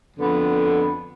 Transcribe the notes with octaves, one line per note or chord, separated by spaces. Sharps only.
F2 D3 F3 B3